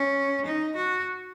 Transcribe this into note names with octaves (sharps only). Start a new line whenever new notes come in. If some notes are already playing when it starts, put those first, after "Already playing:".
Already playing: C#4
D#4
F#4